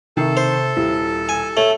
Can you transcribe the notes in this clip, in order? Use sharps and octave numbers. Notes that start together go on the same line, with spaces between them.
C3 D#3 A4 E5 A5
C5
D#1 E4 G4
G#5
A3 C#5